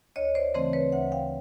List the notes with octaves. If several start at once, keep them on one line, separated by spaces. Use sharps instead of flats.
D2 C#5 D#5
C5 D5
C#3 E3 A3 C4 C5 D5
B4 C#5
D2 E5 F#5
F5 G5